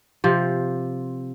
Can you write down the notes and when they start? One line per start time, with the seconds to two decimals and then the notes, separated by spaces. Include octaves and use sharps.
0.24 C3 F3